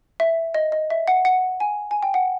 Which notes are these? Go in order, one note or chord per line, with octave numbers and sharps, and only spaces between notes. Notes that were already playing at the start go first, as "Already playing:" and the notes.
E5
D#5
D#5
E5
F#5
F#5
G#5
G#5
G5
F#5